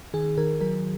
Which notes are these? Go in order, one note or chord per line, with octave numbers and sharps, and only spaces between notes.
D#3 G#4
D#3 A#4
F#3 A#4